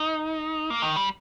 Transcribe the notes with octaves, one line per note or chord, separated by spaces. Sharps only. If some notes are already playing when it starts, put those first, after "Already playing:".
Already playing: D#4
A#3
D#3
G3